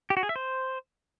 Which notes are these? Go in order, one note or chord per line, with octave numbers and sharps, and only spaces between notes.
G4
F#4
G#4
E5
C5